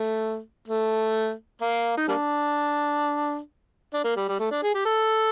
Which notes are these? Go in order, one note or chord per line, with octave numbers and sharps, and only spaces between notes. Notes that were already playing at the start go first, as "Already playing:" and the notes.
Already playing: A3
A3
A#3
D#4
G3 A#3 D4
D4
A#3
G3
G3
A3
D4
G#4
G4
A4